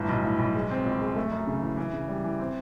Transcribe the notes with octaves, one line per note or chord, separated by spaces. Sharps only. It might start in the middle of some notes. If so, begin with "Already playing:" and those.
Already playing: G1 A2
B1
A2
B1
G#3
C4
C#2
G#3
A3
F#2
C#3
E3
E3
C#3
G3
E3
C4